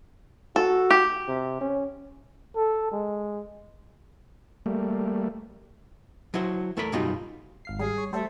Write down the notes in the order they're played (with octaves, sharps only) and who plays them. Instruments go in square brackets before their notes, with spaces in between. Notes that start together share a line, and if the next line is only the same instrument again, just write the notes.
[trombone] F#4 [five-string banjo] A4
[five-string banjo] G4
[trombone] C3
C#4
[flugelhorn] A4
G#3
[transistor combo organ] G3 A3 A#3
[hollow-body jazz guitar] F#3 E4 F#4 C5
E2 A3 A4 A#4 C5 B5
B1 F#2 G3 D#4 F4 F#4
[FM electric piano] G#1 F5 C7
[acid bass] G3 [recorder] G#4
[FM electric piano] C#5
[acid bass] G3 [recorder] A3 [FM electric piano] A4 C5